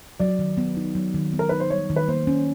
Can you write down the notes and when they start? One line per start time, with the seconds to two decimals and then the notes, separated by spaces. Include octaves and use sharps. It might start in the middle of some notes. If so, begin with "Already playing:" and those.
0.20 F#3 D5
0.39 D#3
0.57 B3
0.77 D#4
0.95 F#3
1.14 D#3
1.33 B3
1.39 A#4
1.49 D#4 B4
1.60 C5
1.70 G3 C#5
1.90 D#3
1.96 B4
2.08 A#3 C5
2.27 C#4